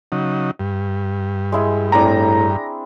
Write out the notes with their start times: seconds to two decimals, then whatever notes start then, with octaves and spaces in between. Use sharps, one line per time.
0.12 C#3 F#3 D#4
0.59 G2
1.52 G#3 E4 G#4
1.92 A2 C4 D4 A#5